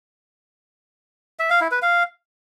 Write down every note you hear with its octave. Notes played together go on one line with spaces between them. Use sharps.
E5
F5
E4
B4
F5